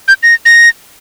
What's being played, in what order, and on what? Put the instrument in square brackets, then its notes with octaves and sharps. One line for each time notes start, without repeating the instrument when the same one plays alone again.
[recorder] G6
A#6
A#6